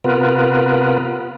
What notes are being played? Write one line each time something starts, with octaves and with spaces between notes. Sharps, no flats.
C3 B3 F4 A#4 B4